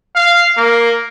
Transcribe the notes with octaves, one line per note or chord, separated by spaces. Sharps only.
F5
A#3